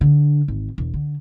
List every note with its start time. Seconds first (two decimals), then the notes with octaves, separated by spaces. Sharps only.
0.01 D3
0.48 G#1
0.78 E1
0.94 D3